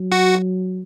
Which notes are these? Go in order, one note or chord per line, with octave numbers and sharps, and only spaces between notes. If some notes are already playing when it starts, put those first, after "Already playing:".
Already playing: F#3
F#4 F#5